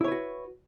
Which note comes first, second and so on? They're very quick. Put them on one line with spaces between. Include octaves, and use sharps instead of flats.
E4 C#5 B4 F#4